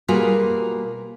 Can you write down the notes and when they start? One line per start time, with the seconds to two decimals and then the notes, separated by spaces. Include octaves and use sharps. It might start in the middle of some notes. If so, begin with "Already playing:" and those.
0.08 B2 G3 A#3 F4 F#4 G#4